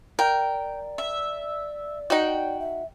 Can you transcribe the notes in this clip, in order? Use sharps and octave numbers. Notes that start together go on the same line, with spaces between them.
A#4 D5 G5
E5
D#4 F#4 G5
E5